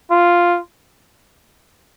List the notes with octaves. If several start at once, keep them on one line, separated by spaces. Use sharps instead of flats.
F4